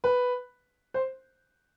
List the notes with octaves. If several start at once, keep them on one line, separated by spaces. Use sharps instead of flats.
B4
C5